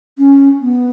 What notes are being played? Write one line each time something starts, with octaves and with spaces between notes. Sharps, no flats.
C#4
B3